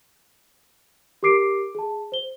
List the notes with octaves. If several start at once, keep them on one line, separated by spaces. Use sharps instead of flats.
G4 A#4 D6 C7 D7
G#4 A5
C5 G7